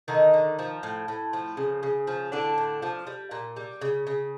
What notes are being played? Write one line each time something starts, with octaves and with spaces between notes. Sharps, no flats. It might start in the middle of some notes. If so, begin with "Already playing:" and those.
D3 D#3 D#4
D3
F3
A2
A2
F3
C#3
C#3
F3
A2 D3 D4
A2
F3
G3
A#2
G3
C#3
C#3